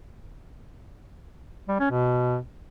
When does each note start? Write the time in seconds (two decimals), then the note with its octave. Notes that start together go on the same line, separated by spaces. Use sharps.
1.69 G3
1.80 C#4
1.91 B2